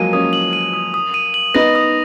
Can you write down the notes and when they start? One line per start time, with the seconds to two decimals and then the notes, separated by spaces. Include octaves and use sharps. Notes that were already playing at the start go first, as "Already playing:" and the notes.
Already playing: F3 F#3 G#3 A#3 D#7
0.13 A#3 C#4 D#6
0.33 F#7
0.53 D#7
0.74 D#6
0.94 D#6
1.14 D#7
1.34 F#7
1.54 B3 D#4 A#6
1.75 D#6